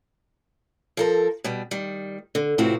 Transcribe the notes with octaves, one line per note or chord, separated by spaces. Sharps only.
F3 A4 A#4
B2 G3
D#3 G3
D3
A2 C3 E3 F3 C4 F#4